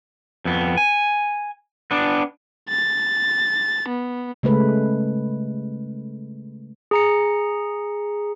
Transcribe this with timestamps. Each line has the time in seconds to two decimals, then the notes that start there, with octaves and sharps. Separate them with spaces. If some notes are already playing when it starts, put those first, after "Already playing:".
0.45 F2 B3
0.77 G#5
1.91 B3 D4
2.69 A6
3.88 B3
4.43 C#3 G#3 A3 B4
6.91 G#4 A#5 C#7